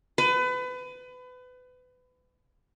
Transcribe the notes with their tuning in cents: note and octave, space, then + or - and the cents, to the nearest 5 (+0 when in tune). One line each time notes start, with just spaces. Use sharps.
B4 +30